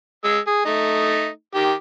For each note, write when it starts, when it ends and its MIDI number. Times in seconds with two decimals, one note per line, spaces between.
0.24 0.38 56
0.24 0.38 88
0.47 0.63 68
0.65 1.29 57
0.65 1.29 63
1.55 1.73 51
1.55 1.73 67